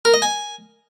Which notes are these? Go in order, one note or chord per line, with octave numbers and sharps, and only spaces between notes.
A#4
D#5
G#5